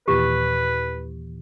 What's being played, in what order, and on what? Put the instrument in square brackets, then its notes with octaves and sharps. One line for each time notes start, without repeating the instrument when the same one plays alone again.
[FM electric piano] D#2 A#2 E3 [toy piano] G4 [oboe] B4